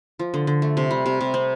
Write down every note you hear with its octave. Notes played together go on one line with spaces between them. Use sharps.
F3
D3
D3
A3
C3
G3
C3
C3
C4